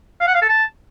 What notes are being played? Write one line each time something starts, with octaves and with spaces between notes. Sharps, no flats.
F5
F#5
F5
A4
A5